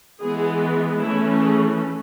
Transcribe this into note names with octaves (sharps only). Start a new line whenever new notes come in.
E3 G#3 B3 G#4
E3 A3 C#4 E4
G#4